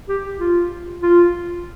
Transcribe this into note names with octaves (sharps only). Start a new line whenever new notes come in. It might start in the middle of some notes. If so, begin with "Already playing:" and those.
G4
F4
F4